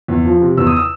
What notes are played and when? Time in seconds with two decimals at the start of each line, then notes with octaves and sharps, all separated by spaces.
0.08 E2
0.25 F3
0.41 C3
0.57 E2 E6
0.67 D#6
0.76 E6